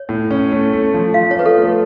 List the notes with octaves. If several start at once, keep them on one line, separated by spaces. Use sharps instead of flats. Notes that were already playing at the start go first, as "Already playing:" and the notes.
Already playing: C#5
A2
C#4
A3
A3
F3
F3 F5
C#5
F4 B4
A4
A3 C#5